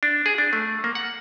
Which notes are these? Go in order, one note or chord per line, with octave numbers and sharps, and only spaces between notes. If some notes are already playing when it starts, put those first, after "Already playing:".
D4
G#4
D4
A3
A#3
F#5